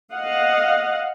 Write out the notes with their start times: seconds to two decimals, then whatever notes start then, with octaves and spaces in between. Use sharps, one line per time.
0.13 D#5 F5 F#5